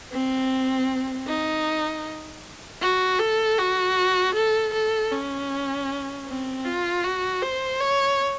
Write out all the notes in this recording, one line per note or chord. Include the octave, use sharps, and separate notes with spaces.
C4
D#4
F#4
A4
F#4
A4
A4
C#4
C4
F4
F#4
C5
C#5